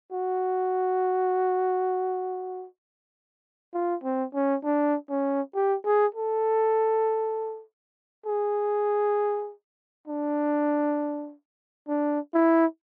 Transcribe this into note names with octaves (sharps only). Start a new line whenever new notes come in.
F#4
F4
C4
C#4
D4
C#4
G4
G#4
A4
G#4
D4
D4
E4